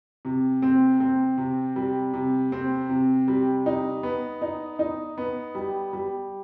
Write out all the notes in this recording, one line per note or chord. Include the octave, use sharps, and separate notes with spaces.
C3
C4
C4
C3
G3
C3
C4
C3
G3
D#4
B3
D#4
D#4
B3
G3
G3